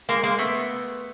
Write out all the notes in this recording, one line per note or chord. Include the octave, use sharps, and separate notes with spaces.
G#3 A#3
G#3 A#3
A3 B3